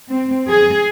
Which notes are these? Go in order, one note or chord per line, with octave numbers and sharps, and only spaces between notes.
C4
G#4